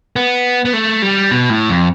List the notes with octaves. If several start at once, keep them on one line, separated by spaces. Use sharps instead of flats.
B3
B3
A3
G3
B2
A2
F2